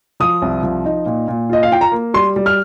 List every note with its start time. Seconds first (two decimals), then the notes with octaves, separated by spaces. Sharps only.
0.20 F3 D#6
0.42 C2
0.63 F3
0.85 D#4
1.06 A#2
1.28 A#2
1.50 F4 D#5
1.63 F5
1.72 F4 G5
1.81 A#5
1.92 A#3
2.14 G3 C6
2.36 G3
2.46 F6